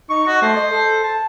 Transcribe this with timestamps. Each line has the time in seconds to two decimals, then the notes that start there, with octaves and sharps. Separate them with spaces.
0.10 D#4 C#6
0.27 F#4 D#5
0.42 A3 C5
0.56 D#5
0.71 A4
1.04 A5